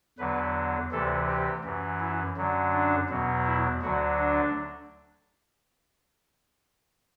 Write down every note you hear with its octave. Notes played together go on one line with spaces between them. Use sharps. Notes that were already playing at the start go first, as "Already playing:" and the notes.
E2 D3 F#3 B4
D2 C3 E3 A4
G4
F#2 E3
E4
F#2 D3 F#3
D4
E2 B2 F#3
E4
D2 D3 F#3 F#4
D4